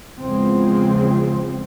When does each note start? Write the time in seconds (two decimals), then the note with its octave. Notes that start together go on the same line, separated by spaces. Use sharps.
0.20 E2 C#3 F3 G#3 C4